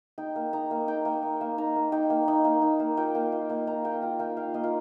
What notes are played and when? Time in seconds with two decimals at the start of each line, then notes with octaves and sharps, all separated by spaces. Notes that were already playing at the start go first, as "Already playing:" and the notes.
0.18 D#4 G5
0.36 A#3
0.53 D#4 A#5
0.71 A#3
0.88 D#4 G5
1.05 A#3
1.22 D#4
1.41 A#3
1.58 D#4 A#5
1.76 A#3
1.92 D#4 G5
2.10 A#3
2.28 D#4
2.45 A#3
2.62 D#4
2.80 A#3
2.97 F4 G5
3.15 A#3
3.32 F4
3.50 A#3
3.67 F4 A#5
3.85 A#3 G5
4.01 F4 A#5
4.19 A#3 G5
4.37 F4 F5
4.54 A#3 D#5
4.64 F4